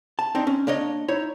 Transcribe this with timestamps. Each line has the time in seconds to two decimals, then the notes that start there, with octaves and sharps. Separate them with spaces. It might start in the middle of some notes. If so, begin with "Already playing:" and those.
0.19 A5
0.35 C4 D4 D#4
0.47 C#4
0.67 A#3 D4 C#5 D#5
1.08 D#4 E4 C#5